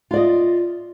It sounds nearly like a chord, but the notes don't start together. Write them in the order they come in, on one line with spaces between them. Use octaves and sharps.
F4 D5 D#5